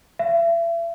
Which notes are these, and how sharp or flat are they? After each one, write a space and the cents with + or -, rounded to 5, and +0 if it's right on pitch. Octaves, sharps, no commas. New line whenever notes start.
E5 +35